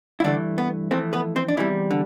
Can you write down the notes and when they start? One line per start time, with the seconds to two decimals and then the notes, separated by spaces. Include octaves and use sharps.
0.20 E4
0.24 G2 D3 E3 A3 D4
0.58 B3
0.91 F2 E3 A3 C4
1.13 B3 B4
1.36 C4 C5
1.48 D4
1.57 E2 C3 E3 G3 E4
1.91 D3